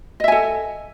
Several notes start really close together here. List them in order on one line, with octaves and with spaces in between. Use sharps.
D#5 E5 G#5 A4